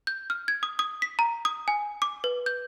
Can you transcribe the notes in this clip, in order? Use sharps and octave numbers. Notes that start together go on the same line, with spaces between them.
G6
F6
G#6
D#6
D#6
B6
A#5
D#6
G#5
D6
B4
G6